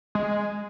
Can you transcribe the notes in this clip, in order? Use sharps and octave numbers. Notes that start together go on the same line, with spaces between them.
G#3